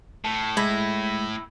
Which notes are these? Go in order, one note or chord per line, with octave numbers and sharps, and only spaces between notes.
A2 A5
G#3 E4 G#6 A#6 B6